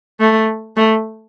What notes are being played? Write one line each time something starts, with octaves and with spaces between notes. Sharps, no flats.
A3
A3